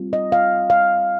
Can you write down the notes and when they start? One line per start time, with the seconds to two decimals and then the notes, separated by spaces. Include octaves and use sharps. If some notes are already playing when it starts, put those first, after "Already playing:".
Already playing: G3 C4 F4
0.13 D#5
0.32 F5
0.70 F5